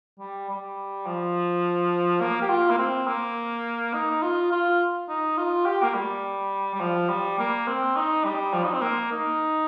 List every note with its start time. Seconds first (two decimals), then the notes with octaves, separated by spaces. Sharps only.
0.19 G3
0.49 G3
1.06 F3
2.20 A#3
2.42 G4
2.49 F4
2.70 A#3
2.78 C4
3.07 A#3
3.94 D#4
4.22 F4
4.52 F4
5.09 D#4
5.37 F4
5.66 G4
5.83 A#3
5.94 G3
6.75 G3
6.81 F3
7.10 G3
7.39 A#3
7.68 C4
7.96 D#4
8.24 G3
8.54 F3
8.64 D#4
8.73 C4
8.82 A#3
9.12 D#4